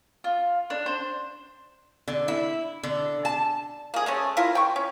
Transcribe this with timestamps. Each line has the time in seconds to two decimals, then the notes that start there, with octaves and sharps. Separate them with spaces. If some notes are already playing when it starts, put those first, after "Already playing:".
0.24 F4
0.70 D4
0.86 C5
2.08 D3
2.28 E4
2.83 D3
3.25 A5
3.94 A#3 G#4
4.06 G#3 A3 C#4
4.37 E4 F4 A#4
4.55 G5 C#6
4.76 C#4